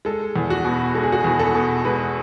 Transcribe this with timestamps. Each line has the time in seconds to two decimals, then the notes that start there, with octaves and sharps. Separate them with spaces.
0.05 G#3 A4
0.36 E2
0.50 F#4
0.64 B2
0.95 G#3 A4
1.04 G#4
1.12 F#4
1.20 E2 G#4
1.39 A4
1.55 B2
1.85 G#3 B4